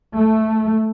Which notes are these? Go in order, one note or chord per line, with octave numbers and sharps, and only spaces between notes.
A3